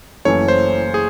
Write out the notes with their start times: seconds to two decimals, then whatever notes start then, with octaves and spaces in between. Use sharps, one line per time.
0.25 F#1 F#2 E3 A3 C#4 C#5
0.48 C5
0.94 G#4